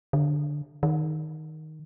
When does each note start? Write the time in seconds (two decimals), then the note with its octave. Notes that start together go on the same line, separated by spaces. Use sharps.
0.13 D3
0.83 D#3